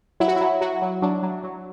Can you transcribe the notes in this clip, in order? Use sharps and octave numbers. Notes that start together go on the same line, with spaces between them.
F#3 E4
F#4
F#3 E4
F#3 F#4
F#3
F#3 D4
F#3
F#3